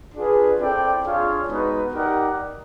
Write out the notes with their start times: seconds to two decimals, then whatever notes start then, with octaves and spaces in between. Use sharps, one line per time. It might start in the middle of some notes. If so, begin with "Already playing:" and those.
0.15 D4 F4 G#4 B4
0.60 C4 E4 A4 D5 G5
1.04 D4 F4 G#4 C#5 F5
1.49 G#3 B3 D#4 F#4 B4
1.93 D#4 G4 A#4 D5 F#5